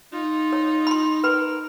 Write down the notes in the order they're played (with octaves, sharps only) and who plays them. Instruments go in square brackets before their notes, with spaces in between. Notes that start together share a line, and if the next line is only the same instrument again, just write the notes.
[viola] D#4 [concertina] F4
[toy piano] C#5
B5 C6
[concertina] A#4 [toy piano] B4 B5